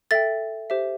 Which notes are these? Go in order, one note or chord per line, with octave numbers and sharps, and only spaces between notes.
A4 E5 G5 A6
G4 C5 E5